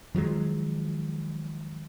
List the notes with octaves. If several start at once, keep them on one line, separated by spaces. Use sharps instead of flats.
D#3 F3 F#3 G#3